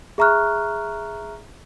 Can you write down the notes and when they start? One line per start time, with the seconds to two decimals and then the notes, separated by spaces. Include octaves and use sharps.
0.18 G#4 E5 A#5 C#6 F6 F#6